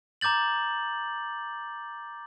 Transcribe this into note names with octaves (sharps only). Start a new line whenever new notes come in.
A#5 D6 G6 A6 F#7